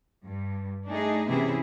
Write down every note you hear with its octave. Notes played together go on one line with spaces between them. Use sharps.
G2
A3 D4 D#4 G#4
C3 E3 B3 C#4 E4 G#4